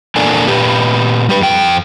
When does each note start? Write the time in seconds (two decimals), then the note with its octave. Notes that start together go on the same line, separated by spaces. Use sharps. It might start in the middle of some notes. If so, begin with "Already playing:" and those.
0.16 E2 A#2 D4 A4 A#4 G#5
0.47 A#2 G4 B4
1.29 G3 G4 B4
1.41 F2 G5